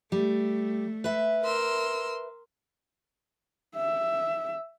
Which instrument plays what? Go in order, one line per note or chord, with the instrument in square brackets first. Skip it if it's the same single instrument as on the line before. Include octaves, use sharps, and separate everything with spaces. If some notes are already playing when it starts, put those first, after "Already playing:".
[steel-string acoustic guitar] G3 [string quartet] A3
[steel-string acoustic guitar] B4 E5
[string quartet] A#4 C6 E6
[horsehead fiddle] E5